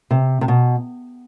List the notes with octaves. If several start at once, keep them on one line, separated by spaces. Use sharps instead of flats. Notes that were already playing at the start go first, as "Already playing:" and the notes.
C3
C3
B2